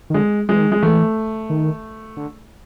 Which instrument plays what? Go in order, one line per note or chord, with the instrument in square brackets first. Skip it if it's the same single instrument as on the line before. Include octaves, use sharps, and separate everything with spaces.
[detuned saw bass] D#3
[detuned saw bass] D3 [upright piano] G#3
[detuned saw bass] E3 [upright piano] G#3
[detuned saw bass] D#3
[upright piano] G#3
[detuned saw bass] E3 [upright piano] A3
[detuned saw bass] D#3
D3